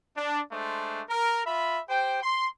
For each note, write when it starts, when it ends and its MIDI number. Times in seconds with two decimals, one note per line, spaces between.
0.17 0.40 62
0.51 1.01 56
0.51 1.01 57
0.51 1.01 62
0.51 1.01 72
1.10 1.41 70
1.46 1.79 65
1.46 1.79 76
1.46 1.79 83
1.89 2.22 67
1.89 2.22 72
1.89 2.22 79
2.23 2.47 84